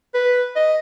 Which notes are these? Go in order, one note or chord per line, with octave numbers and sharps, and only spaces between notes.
B4
D#5